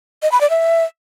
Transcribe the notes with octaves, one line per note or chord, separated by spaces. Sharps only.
D#5
B5
D5
E5